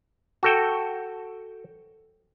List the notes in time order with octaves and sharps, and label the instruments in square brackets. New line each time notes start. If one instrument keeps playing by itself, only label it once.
[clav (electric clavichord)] F#4 A4 G5